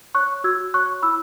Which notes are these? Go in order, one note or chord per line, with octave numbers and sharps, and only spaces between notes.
C#5 C#6 F#6
F#4 E6 G#6
C#5 C#6 F#6
E4 B5 E6